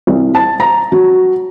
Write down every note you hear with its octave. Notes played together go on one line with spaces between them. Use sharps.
C2
A5
A#5
F#3